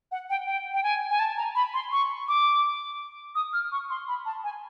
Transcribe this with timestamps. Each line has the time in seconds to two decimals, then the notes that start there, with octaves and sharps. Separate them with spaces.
0.12 F#5
0.30 G5
0.47 G5
0.74 G5
0.83 G#5
1.10 G#5
1.19 A5
1.37 A#5
1.55 B5
1.74 C6
1.92 C#6
2.28 D6
3.35 D#6
3.53 F6
3.72 C#6
3.90 C6
4.08 B5
4.25 A5
4.44 G#5